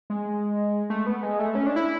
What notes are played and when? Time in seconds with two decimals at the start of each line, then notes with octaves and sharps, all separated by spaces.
0.10 G#3
0.90 A3
1.06 B3
1.23 G#3
1.39 A3
1.55 C#4
1.66 D4
1.76 E4